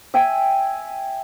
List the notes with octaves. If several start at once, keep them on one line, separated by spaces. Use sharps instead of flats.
E5 G5 G#5